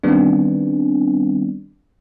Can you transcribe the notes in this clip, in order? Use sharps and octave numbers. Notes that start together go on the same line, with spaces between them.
D#3 G3 B3 C4 D4